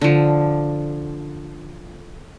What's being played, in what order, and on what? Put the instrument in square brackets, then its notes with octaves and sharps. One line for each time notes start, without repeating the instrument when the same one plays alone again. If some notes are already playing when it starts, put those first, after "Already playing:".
[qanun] D3 F3